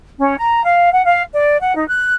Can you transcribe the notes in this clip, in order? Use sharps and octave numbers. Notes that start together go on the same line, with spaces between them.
C#4
A#5
F5
F#5
F5
D5
F#5
D#4
F#6